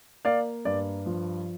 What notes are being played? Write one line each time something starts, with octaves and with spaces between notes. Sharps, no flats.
A#3 D5 F5
G2 D5
F3